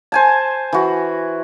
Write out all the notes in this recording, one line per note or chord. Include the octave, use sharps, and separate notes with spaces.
C5 G#5 A5
E3 F#4